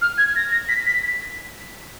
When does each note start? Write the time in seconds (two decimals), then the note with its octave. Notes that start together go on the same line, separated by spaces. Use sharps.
0.01 F6
0.18 G#6
0.36 A#6
0.52 A#6
0.69 B6
0.86 B6
1.03 B6